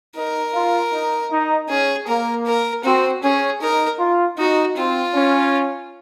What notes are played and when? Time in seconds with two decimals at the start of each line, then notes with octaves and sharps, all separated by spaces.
0.15 D#4 A#4
0.54 F4
0.93 D#4
1.31 D#4
1.69 C#4 G#4
2.07 A#3 A#4
2.46 A#4
2.84 C4 F#4
3.23 C#4 G#4
3.61 D#4 A#4
4.00 F4
4.37 D#4 F#4
4.77 C4 F4
5.14 C#4